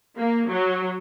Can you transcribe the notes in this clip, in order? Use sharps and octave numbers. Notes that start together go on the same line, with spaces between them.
A#3
F#3